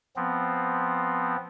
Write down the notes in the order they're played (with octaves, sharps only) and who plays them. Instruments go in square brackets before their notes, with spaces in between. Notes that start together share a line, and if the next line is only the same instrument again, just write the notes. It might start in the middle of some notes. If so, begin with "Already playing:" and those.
[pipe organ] F3 B3 C4